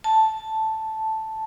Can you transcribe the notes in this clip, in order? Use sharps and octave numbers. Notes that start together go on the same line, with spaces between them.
A5